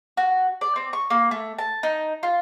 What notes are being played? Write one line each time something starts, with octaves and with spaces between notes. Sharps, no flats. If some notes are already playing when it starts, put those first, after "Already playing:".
F#4
D5
C4
C#6
A#3
A3
A5
D#4
F4